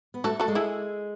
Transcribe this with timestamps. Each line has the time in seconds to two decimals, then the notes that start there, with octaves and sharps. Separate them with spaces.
0.14 B3
0.24 A3 F#4 A4
0.40 F#4 A4
0.48 G#3
0.55 E4 G#4